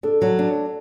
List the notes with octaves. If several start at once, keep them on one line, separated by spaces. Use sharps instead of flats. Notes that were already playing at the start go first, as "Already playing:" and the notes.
D4 A4
F#3
D4